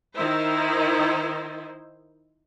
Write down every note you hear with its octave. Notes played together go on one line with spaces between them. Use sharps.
D#3 D#4 E4 C5